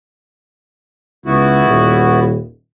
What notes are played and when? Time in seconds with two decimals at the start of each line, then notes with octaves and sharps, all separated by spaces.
1.26 C#2 B3 E4 F#4
1.65 D#1